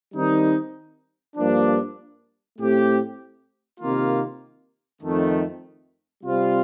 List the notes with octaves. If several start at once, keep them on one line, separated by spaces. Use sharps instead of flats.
D#3 G3 C4 D#4
G2 F3 A#3 D4
A2 A3 C4 G4
C3 D#3 A#3 F4
F2 D#3 A3
C3 G3 C4 F4